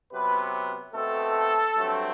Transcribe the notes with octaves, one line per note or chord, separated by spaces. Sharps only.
C3 F#3 B3 B4
B2 A3 C4 A4
G2 F#3 A3 C4